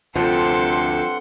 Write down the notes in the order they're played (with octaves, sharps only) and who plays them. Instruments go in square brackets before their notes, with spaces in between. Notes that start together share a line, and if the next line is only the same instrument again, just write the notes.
[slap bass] D2 C3 [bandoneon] G2 F#5 C6 [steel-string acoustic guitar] F3 [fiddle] C4 A4